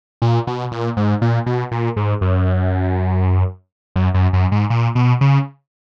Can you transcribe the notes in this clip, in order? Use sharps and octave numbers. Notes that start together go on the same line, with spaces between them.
A#2
B2
A#2
G#2
A#2
B2
A#2
G#2
F#2
F#2
F#2
F#2
G#2
A#2
B2
C#3